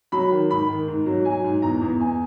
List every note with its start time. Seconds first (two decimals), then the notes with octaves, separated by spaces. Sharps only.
0.12 F#3 B5
0.31 D#3
0.49 G#2 B5
0.68 D#3
0.88 G#2
1.06 F#3
1.24 F#3 G#5
1.44 G#2
1.62 E2 A#5
1.81 E2
2.00 E2 G#5